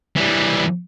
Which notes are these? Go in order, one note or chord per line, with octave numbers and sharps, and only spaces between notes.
E3 G3